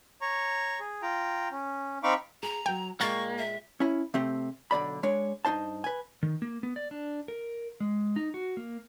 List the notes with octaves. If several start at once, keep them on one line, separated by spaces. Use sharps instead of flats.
C#5 A#5 C#6
G#4
F4 G5 A#5
C#4
C4 D#4 F5 B5 C#6 D6
G#4 A#5
F#3 G5 G#5
A#2 G#3 A#3 F5 G5 C#6 G#6 A6
E5
C#4 E4
C3 A3 C4 G4
B1 D3 D5 B5
G#3 D4 C#5
G2 D#4 C5 A5
B4 G#5
D#3
A#3
B3
D5
D4
A#4
G#3
D#4
F#4
A#3